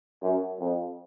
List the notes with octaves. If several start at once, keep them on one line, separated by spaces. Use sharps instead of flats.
F#2
F2